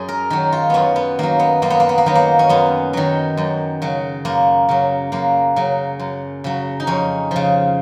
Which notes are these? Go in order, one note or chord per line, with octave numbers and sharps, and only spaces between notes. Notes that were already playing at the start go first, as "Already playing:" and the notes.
Already playing: F#2 G#4
A#4
D#3 F#3
F4
F#2 B3 C#4
B3
D#3 F#3 A#3
B3
F#2 A#3
B3
A#3
B3
A#3
D#3 F#3 B3
A#3
C#4
F#2 B3
D#3 F#3
F#2
C#3 F#3
F#2 A#3
C#3 F#3
F#2 A#3
C#3 F#3
F#2
C#3 F#3
D#4
F2 C#4
C#3 F3